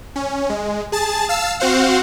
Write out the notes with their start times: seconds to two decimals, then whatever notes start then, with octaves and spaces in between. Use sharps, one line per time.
0.16 C#4
0.50 G#3
0.92 G#4 A5 A6
1.29 F5 A5 E6
1.60 C4 F#4 C5 F5 F#5